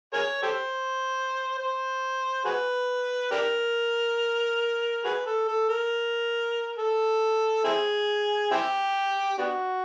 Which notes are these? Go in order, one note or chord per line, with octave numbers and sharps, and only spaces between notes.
G#4 A#4 C#5
G4 A4 C5
C5
F#4 G#4 B4
D4 G4 A#4
F#4 G#4 B4
A4
A4
A#4
A4
C4 E4 G#4
C4 E4 G4
B3 D4 F#4